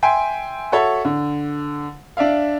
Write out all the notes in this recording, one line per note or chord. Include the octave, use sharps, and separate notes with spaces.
E5 G5 G#5 C6
F#4 A4 C#5 E5
D3
D4 D5 E5 F5